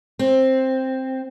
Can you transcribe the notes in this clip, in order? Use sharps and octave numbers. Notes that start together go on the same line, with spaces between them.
C4